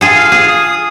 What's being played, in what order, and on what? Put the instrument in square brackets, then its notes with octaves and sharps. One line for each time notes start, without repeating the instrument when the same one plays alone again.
[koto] F4 G#4 A4
[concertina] F5
[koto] G#4
[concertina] D#6